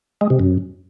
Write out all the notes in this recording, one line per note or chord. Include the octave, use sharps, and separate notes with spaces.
G#3
C3
F#2